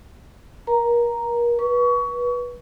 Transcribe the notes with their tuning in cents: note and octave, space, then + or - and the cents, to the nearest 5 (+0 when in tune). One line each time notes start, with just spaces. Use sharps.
A#4 +35 A#5 +0
B4 -25 C#6 +25